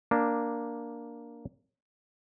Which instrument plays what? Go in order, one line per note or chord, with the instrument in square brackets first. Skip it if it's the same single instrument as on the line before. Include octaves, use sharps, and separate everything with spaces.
[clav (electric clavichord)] A#3 D4